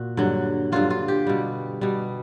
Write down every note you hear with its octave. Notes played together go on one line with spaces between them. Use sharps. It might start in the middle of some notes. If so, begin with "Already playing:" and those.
Already playing: A#2 F#4
G2 D3 F#3
G2 D3 F#3 F4
F4
G4
B2 G3
B2 G3